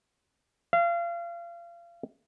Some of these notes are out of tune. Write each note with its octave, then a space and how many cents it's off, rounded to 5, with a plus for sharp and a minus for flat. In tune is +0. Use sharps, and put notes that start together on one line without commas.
F5 -30